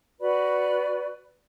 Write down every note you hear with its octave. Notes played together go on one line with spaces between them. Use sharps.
F#4 B4 D5 B5